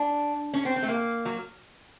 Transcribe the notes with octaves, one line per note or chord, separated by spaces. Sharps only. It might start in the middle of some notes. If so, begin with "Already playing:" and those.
Already playing: D4
C#4
C4
C4
A3
A#3
F#3